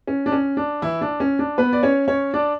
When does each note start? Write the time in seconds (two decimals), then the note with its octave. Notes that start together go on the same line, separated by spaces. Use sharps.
0.07 C#4
0.26 D4
0.32 C#4
0.57 D4
0.82 E3 E4
1.01 D4
1.20 C#4
1.39 D4
1.58 B3 B4
1.73 D5
1.83 C#4 C#5
2.08 C#4 C#5
2.33 D4 D5